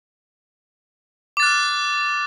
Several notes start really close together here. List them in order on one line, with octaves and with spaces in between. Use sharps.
D6 A6 F#6 F6